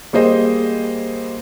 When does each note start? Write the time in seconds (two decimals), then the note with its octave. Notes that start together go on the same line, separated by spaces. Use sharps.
0.13 G3 A#3 G#4 C5 D#5